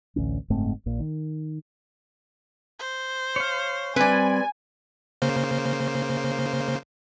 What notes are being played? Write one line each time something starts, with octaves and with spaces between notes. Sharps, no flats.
A1 D2 C#4
F#1 G#2 A3 C4
A#1 A#2
D#3
C5
C#5 F5
G3 C4 B4 D5 G#5
C#3 A#3 C5